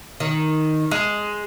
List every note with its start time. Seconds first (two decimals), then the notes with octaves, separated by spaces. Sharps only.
0.20 D#3
0.91 G#3